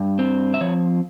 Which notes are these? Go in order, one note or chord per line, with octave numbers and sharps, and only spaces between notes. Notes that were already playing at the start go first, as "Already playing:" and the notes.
Already playing: G2
C4
E5
F3 C#5